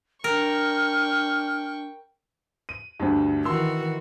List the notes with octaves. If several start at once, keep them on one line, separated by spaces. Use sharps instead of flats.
D4 A#4 G5 C#6 F6
D#7
D2 G2
D#3 E3 F#4 C6 E6